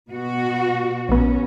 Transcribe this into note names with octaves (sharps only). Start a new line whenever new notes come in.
B2 F#4
A#1 B3 C#4